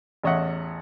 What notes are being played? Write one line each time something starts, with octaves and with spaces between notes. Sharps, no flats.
A1 E2 C#5 D#5 E5 F#5